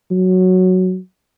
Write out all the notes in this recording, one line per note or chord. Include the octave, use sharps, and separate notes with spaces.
F#3